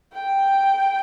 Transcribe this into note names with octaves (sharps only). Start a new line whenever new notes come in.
G5